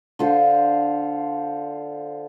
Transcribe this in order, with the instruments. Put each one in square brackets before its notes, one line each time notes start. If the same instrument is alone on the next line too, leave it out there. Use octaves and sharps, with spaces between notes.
[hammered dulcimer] D3 F4 C5